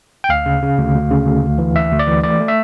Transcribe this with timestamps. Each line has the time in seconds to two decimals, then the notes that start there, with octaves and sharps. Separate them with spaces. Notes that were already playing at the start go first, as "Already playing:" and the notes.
0.24 G5
0.29 D2 F5
0.46 C#3
0.63 C#3
0.78 D2
0.95 D2
1.11 C#3
1.26 D2
1.43 D2
1.58 E3
1.75 D2 E5
1.91 D2
1.99 D5
2.07 E3
2.23 A3 D5
2.40 A3
2.48 E5